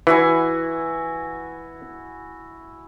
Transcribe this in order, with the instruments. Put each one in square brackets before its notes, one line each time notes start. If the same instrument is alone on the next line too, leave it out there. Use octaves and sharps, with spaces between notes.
[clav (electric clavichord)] E3 [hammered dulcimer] E4 F#4 G#5